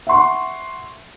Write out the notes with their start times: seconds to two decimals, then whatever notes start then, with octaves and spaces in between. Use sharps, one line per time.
0.07 E5 F#5 C6 C#6